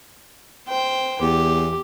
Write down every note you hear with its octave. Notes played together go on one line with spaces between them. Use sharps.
C5 G5
E2 G4